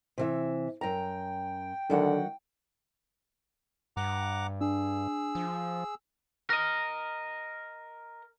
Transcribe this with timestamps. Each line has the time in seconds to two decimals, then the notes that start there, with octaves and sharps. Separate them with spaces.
0.18 C3 E3 E5
0.81 F#2 G5 A#5
1.90 D3 D#3 F#3 F#5
3.97 G2 F#5 A#5 D6
4.61 D4 G#4 E6
5.35 F3
6.50 A#4 D#5